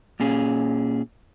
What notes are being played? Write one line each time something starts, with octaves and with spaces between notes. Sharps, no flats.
A#2 C#4 G#4